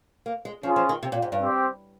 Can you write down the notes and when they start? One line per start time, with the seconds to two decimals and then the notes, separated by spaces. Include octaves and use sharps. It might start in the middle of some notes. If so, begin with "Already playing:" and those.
0.26 A#3
0.45 G#3
0.63 F3 C#4 F4 G#4
0.76 F3
0.89 D#3
1.03 C3
1.12 A#2
1.22 G#2
1.32 G2
1.42 C4 G4 C5